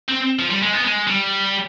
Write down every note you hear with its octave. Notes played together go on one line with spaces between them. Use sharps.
C4
F3
G3
G#3
B3
G#3
G3